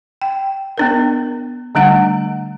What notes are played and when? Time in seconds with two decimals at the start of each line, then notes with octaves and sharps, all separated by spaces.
0.22 G5
0.78 B3 D4 A#4
1.75 D3 G3 A3 D4 F#5